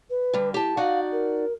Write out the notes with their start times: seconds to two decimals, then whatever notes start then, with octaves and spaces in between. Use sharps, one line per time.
0.10 B4
0.33 D3 G3
0.54 E4 G4 A5
0.77 D#4 F#4 D5 F5
1.12 A#4